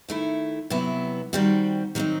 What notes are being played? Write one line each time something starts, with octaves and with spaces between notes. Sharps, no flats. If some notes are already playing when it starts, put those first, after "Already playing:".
D#3 A3 E4
C3 F#3 B3 E4
D#3 G3 C4 F#4
D#3 F#3 C4 D#4